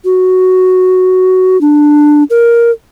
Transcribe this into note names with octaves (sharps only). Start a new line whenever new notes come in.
F#4
D4
A#4